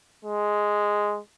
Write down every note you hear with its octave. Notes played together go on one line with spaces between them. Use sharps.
G#3